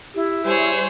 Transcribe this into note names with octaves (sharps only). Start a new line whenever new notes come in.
E4 G4
G3 G#4 C5 C#5